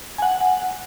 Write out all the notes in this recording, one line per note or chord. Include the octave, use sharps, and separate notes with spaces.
F#5 G#5